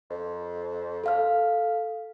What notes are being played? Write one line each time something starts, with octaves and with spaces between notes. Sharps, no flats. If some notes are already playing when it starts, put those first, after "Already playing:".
F2
A4 F5 F6